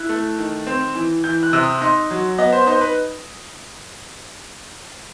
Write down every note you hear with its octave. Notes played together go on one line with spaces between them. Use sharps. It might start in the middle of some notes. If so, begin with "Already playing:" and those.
Already playing: E4 F#6
A3
D#3
C4
E3
E3 G6
F#6
C3
D#6
D#4 C6
F#3
B3 D#5
C5
D#4 C5
B4